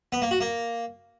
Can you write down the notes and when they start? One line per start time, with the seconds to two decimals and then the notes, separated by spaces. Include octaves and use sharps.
0.12 B3
0.22 A#3
0.31 F#4
0.40 A#3